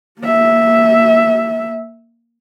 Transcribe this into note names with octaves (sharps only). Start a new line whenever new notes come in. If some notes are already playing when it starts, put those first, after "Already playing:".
A#3 E5